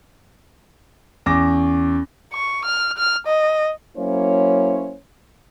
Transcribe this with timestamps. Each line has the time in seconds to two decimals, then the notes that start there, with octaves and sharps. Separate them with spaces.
1.26 E2 C#4 D6 A#6
2.33 C#6
2.65 F6
2.98 F6
3.27 D#5
3.97 F#3 A#3 C#4 E4 C5 C#5